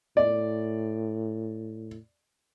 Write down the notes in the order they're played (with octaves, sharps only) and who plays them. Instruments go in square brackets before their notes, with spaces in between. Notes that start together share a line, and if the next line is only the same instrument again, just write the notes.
[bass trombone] A2 [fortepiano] D5